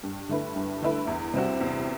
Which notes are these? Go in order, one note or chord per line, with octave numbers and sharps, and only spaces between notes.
G2
D3 A3 E4 B4
G2
D3 A3 E4 B4
E2
C3 G3 C4 F#4
E2